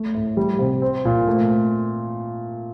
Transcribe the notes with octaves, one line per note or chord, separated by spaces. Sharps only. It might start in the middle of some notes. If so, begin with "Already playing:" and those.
Already playing: A3
A2
G3
C3
C4
A#2
A3